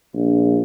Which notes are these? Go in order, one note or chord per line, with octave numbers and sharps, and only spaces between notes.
A#1